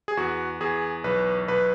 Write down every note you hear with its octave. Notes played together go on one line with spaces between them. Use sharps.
G#4
E2 F#4
E2 G#4
B1 B4
B1 B4